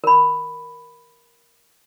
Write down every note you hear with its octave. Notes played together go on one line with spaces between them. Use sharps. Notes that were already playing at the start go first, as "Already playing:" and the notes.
A#4 B5